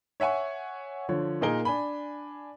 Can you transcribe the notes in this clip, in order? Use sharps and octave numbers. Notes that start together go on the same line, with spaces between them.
C#5 E5 F#5 G#5 C#6
D3 F3 C#5
A#2 A#3 D#4 G#4 A#4 G7
D4 G#5 B5